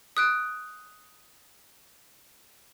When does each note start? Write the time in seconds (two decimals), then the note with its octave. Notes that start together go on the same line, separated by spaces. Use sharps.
0.17 D#6 F#6 D7